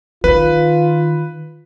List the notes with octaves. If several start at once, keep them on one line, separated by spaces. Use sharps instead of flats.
D#3 F4 B4